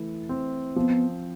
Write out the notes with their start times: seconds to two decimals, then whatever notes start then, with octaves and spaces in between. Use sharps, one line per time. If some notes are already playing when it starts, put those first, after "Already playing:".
Already playing: E3 A3 E4
0.29 C4
0.76 F3 B3